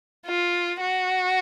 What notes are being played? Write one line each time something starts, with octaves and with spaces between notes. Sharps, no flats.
F4
F#4